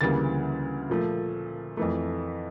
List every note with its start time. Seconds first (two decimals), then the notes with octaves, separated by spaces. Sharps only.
0.01 D2 C#3 E3 G3 A#3 A6
0.90 A#2 F3 A3
1.77 F2 E3 A3